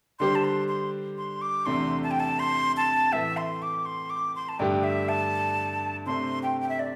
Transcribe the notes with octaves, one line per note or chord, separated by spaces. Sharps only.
D3 G3 D4 G4 C5 C6
A5
C6
C6
C6
D6
E2 C3 A3 D4 C6
A5
G5
A5
C6
A5
A2 E3 A3 E5
C6
D6
C6
D6
C6
A5
G2 D3 A3 D4 G4 G5
E5
A5
C3 A3 D4 C5 C6
G5
G5
E5
D5